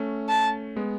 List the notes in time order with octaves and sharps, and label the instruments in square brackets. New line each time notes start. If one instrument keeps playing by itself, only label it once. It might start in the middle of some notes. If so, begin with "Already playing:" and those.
Already playing: [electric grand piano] A3 C#4
[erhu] A5
[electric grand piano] G#3 B3